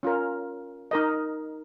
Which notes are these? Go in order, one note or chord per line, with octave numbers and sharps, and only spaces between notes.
C#4 F4 A#4
D#4 A#4 D#5